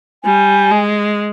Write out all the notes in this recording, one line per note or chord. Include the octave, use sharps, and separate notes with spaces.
G3 G#5
G#3